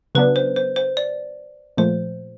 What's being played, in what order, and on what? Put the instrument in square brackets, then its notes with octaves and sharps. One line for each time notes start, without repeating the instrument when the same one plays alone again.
[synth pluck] C#3 F#3 B3 D4 [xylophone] B4
[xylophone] C5
C5
C5
D5
[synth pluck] A#2 F3 A3 [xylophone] C5